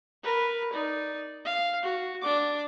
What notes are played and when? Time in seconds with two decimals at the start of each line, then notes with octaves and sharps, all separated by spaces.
0.23 A#4 B4
0.73 D#4 D5
1.45 F5
1.82 F#4
2.22 D4 D6